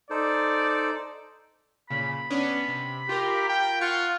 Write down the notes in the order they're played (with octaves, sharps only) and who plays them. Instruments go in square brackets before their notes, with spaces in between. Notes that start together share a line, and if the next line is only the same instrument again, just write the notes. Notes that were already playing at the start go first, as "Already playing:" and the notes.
[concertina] D#4 A4 C5 [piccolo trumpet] D5
[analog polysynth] A#2 C#3 [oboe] B5
[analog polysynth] B3 C#4 D4
C3
[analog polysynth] F4 A#4 [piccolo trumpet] G4
[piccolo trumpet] G5
[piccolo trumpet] F4 [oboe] F#5 [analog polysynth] C#6